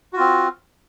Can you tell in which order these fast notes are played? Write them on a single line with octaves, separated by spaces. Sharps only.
F#4 F4 C4